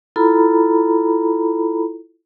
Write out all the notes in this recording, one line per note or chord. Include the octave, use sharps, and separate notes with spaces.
E4 F4 A4 A#5 B5